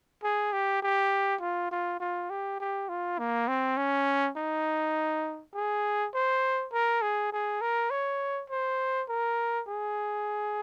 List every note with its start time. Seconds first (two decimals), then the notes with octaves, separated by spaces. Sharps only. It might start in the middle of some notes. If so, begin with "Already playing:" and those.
0.23 G#4
0.53 G4
0.82 G4
1.41 F4
1.71 F4
2.00 F4
2.30 G4
2.60 G4
2.89 F4
3.19 A#3
3.48 C4
3.77 C#4
4.36 D#4
5.54 G#4
6.14 C5
6.73 A#4
7.02 G#4
7.32 G#4
7.61 A#4
7.90 C#5
8.50 C5
9.09 A#4
9.68 G#4